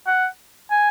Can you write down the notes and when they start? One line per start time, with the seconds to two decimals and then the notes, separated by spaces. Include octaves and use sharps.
0.07 F#5
0.71 G#5